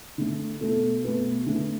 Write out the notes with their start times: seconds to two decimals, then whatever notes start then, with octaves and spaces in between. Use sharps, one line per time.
0.18 D3 A3
0.61 B2 A3 A4
1.04 B2 A3 B4
1.46 D3 A3